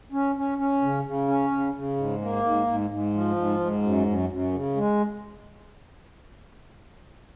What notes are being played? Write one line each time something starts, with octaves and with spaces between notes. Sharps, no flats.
C#4
C#4
C#4
C#3
C#3
C#4
C#3
C#3
G#2
A#3
G#2
G#2
G#2
F3
G#2
G#2
F#2
F#2
F#2
C#3
G#3